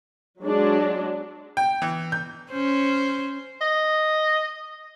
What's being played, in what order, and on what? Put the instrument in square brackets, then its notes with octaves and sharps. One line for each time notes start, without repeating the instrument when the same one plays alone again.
[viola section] F#3 G#3 D4
[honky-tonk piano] G5
E3
G6
[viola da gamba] C#4 C5
[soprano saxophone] D#5